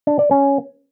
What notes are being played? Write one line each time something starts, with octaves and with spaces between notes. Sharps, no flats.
D4
D5
C#4